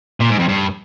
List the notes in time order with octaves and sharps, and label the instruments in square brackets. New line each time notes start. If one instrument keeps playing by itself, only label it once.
[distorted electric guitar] A#2
G#2
F2
G2